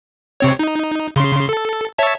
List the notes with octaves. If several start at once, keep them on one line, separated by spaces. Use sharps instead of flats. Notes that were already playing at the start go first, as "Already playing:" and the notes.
C3 C4 C#5
D#4
C#3 C6
A4
C#5 E5 A5